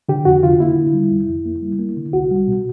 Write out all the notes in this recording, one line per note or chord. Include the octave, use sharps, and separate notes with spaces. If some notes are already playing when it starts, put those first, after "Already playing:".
D3 G4
F2 F#4
D3 F4
A#3 E4
D3
G3
F2
F2
A#3
G3
A#3
D3
C2 F#4
G3
B2